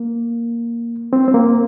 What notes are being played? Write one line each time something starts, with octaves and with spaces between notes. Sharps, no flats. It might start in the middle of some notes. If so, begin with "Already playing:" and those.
Already playing: A#3
C4
C4
A#3